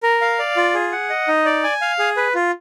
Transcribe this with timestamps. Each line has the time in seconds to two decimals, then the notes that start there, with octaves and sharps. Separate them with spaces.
0.03 A#4
0.21 F5
0.39 D5
0.57 F4
0.74 G#4
0.92 F#5
1.10 D#5
1.28 D#4
1.45 D5
1.64 G#5
1.81 F5
1.99 G#4
2.17 B4
2.35 F4